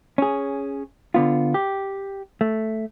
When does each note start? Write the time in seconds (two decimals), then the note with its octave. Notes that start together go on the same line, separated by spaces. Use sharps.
0.18 C#4 G#4
1.14 D3 B3 F4
1.54 G4
2.41 A3